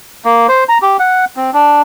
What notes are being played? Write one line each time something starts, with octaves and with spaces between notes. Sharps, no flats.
A#3
C5
A#5
G4
F#5
C4
D4